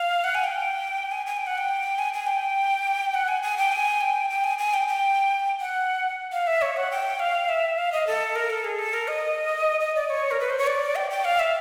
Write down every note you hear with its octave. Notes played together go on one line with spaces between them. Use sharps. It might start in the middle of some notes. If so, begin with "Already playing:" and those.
Already playing: F5
F#5
G#5
G5
G#5
G#5
G5
F#5
G5
G#5
G#5
G5
F#5
G#5
G#5
G5
G#5
G5
G5
G#5
G#5
G5
G5
F#5
F5
E5
C#5
F#5
G5
F5
E5
F5
D#5
A4
A#4
A4
G#4
A4
A#4
D#5
D#5
D5
C#5
A#4
B4
C5
C#5
D5
G5
G5
F5
E5